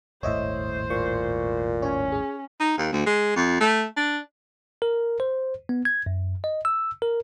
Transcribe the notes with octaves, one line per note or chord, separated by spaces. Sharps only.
D#1 G#1 A2 C5 C#5 D#5 E5
A#2 C#6
C#4 C#5
G#4
D#4
D#2
D2
G#3
F2
A3
D4
A#4
C5
B3
G#6
F#2
D#5
E6
A#4